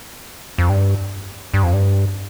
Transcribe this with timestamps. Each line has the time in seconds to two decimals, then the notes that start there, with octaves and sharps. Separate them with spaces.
0.58 F2
0.69 G2
1.54 G2
1.63 F2
1.73 G2